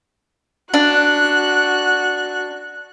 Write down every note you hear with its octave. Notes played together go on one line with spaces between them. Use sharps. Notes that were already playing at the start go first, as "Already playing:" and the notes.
D4 F#4 F#6